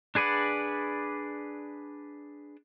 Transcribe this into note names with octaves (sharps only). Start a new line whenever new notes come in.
D4 G#4 B4 D5 F#5